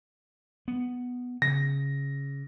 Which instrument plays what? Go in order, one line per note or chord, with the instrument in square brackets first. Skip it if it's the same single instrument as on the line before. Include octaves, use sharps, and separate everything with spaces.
[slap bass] B3
[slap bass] C#3 [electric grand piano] A#6